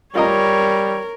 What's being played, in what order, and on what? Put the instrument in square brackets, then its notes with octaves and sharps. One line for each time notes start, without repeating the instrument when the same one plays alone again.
[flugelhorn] G3 [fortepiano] F4 D#5 A#5 [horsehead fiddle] A#4 [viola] C#5